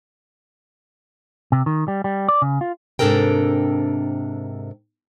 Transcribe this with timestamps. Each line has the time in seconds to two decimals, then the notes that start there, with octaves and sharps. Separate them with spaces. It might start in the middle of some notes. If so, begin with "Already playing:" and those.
1.52 C3
1.66 D#3
1.88 G3
2.04 G3
2.28 D5
2.42 C#3
2.61 F4
2.99 G#2 C3 D4 A4 A#4 G5